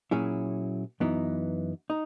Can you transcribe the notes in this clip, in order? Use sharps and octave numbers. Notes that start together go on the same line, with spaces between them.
A#2 F#3 C#4 E4 G#4
F#2 E3 B3 D#4
D#4